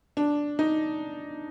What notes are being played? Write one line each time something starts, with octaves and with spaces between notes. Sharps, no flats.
D4
D#4